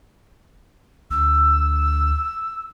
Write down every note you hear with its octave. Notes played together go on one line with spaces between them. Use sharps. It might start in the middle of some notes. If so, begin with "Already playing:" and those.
D2 E6